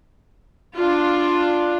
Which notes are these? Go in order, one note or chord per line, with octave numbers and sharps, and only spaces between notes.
D4 F4